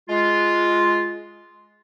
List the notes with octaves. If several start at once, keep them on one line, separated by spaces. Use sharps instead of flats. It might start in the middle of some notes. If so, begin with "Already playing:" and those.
G#3 F4